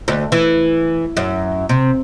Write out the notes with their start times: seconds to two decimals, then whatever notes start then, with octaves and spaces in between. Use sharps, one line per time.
0.08 D2
0.32 E3
1.17 F#2
1.69 C3